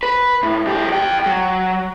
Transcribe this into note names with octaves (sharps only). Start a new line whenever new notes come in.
B4
A2
B1 G4
F2 G5
F#3